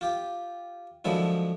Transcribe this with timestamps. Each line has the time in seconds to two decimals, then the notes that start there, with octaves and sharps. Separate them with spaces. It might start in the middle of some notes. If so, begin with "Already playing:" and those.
0.01 F4 G4
1.05 F#2 D3 F3 G#3 E4